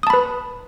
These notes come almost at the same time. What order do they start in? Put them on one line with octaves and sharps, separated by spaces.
D#6 A5 B5 B4